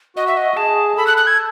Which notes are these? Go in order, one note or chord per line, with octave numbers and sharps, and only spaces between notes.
F#4 D#5
E5
D#5
G#4 A5
A4 B5
F#6
F#6
G#6